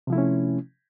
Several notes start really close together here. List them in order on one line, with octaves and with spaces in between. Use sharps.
C3 F3 E4 A3 C#4